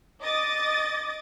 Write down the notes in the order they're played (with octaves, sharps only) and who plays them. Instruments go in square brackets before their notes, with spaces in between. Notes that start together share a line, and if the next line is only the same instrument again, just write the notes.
[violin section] D#5 D6 D#6 A6